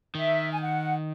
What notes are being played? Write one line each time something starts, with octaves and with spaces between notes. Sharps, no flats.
D#3 E5
G#5
F#5